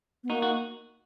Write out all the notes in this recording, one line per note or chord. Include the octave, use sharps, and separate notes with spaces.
B3
A#3 D#4 F#4
F#4